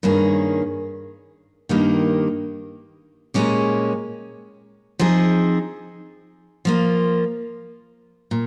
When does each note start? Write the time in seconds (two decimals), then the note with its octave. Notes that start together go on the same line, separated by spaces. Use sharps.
0.03 G2 D#3 A#3 C#4 G#4
1.69 G2 D#3 A#3 D#4 G4
3.34 A#2 G#3 C#4 G4
4.99 F3 C4 D#4 G#4
6.65 F3 A#3 F4
8.31 A#2